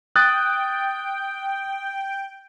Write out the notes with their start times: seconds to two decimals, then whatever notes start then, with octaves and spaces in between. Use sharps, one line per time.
0.16 G5 D#6 F#6 A6